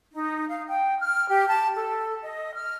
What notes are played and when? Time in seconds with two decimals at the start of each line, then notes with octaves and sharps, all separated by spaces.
0.12 D#4
0.48 F5
0.68 G5
0.99 F6
1.29 G4
1.48 A5
1.75 A4
2.22 D#5
2.54 F6